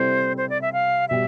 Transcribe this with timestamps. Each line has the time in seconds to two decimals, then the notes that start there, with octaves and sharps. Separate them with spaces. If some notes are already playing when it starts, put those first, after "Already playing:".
Already playing: C3 G3 C4 E4 A4 C5
0.37 C5
0.50 D5
0.62 E5
0.73 F5
1.09 B2 G3 E5